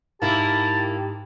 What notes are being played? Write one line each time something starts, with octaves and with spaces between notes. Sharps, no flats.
G#2 A#3 E4 G4 A5